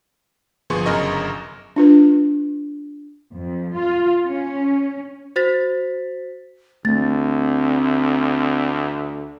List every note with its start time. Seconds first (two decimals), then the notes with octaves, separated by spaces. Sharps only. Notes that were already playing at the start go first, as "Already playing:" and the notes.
0.70 G1 F3 B3 G#4 C6 C#6
0.86 G1 F#2 C#3 A#4 D#5 C#6
1.76 D4 F4 B4
3.32 F2
3.77 F4
4.25 C#4
5.36 F#4 C5 A6 B6
6.85 D2 A3 C4 A6